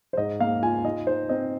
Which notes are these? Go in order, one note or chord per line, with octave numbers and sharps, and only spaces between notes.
C5
G#2 D#5
A#3 F5
F4 G#5
D#4 D#5
D#4 C5
C4 D#5